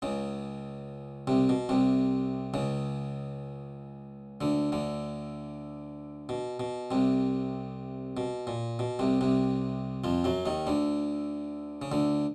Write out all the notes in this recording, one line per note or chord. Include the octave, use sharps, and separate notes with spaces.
C#2 C#3
C2 C3
B2
C2 C3
C#2 C#3
D2 D3
D2 D3
B2
B2
C2 C3
B2
A#2
B2
C2 C3
C2 C3
F2 F3
F#2 F#3
D#2 D#3
D2 D3
C#3
D2 D3